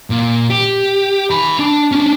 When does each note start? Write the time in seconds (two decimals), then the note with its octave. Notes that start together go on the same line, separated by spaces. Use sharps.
0.10 A#2
0.50 G4
1.31 G#5 B5
1.59 D4
1.92 C#4 D4